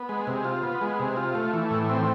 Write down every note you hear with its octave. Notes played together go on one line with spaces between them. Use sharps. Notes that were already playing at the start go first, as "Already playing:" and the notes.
Already playing: B3
G#3
C3
F4
B3
G#3
C3
F4
A3
E3
A2
C4